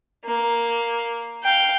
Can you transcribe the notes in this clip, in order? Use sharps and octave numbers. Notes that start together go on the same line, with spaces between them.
A#3
F5 G5